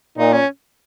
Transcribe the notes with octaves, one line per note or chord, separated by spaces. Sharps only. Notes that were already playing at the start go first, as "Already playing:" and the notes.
A#2 D#4
C#4